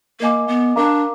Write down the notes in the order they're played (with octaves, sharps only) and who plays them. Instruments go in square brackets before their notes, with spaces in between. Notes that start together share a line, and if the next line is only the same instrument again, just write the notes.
[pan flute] A#3 [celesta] A#4 D#5 G#5 D6
[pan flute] B3
[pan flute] D4 [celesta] A#4 F5 A#5 D6